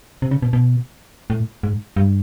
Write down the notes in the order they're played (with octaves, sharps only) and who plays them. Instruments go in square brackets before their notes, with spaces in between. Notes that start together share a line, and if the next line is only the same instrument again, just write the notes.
[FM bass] C3
C#3
B2
B2
A2
G#2
G2